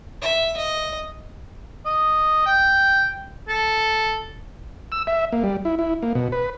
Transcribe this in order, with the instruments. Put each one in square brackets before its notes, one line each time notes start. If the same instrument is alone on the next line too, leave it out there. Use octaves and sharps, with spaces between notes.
[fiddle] E5
D#5
[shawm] D#5
G5
A4
[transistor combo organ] E6
E5
A#3
G3
E4
E4
A#3
B2
B4